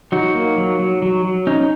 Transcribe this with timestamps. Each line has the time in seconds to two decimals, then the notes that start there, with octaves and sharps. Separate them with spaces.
0.12 F#3 D#4 F#4
0.35 A#3
0.58 F#3
0.80 F#3
1.02 F#3
1.25 F#3
1.47 C#4 D#4